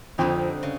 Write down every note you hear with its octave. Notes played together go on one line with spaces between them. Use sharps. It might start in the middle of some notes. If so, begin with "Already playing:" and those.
F2 D3 G3 C4 D#4
C#3